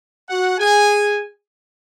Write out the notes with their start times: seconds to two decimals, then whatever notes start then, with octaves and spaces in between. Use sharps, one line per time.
0.28 F#4 F#5
0.58 G#4 G#5